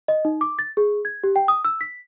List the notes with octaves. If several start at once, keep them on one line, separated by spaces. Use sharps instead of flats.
D#5
D#4
D6
A6
G#4
G#6
G4
G5
D#6
E6
B6